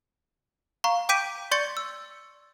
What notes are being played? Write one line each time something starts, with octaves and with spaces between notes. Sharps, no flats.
F5 A#5 C#6
G5 D6 G6 B6 D7 D#7
D5 C6 C#6 G6 A6 C#7
E6